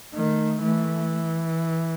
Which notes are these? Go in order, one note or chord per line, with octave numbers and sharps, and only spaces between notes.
D#3 A3
E3 A3